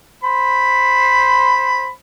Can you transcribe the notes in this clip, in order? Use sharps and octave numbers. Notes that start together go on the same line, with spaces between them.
C5 B5